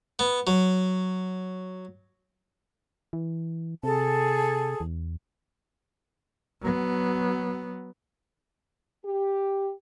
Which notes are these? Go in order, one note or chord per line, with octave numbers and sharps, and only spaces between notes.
B3
F#3
E3
C3 G#4 A4 A5
E2
F#3 B3
G4